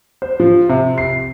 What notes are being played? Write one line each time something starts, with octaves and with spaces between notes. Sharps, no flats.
C5
F3
C3
C7